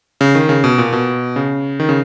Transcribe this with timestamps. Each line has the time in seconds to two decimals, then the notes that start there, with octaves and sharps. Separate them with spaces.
0.21 C#3
0.35 D#3
0.49 C#3
0.64 B2
0.78 A#2
0.93 B2
1.36 C#3
1.80 D#3
1.89 C#3